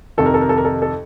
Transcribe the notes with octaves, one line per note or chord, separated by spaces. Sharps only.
F2 C3 D#3 A4
A#4
A4
A#4
A4
A#4
A4
A4